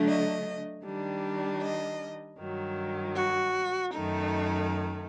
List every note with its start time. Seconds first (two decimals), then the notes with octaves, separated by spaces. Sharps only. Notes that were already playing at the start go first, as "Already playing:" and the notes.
Already playing: D3 F#3 A3 D4
0.08 D#5
0.85 D#3 G3 D4
1.62 D#5
2.39 G2 D#3 F#3
3.16 F#4
3.93 F#2 D#3 A3 D#4